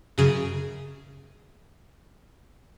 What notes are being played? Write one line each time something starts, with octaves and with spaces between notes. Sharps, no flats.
F#2 C#3 G#4